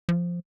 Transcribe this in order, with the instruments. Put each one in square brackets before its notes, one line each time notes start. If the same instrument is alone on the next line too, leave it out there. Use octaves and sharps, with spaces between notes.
[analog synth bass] F3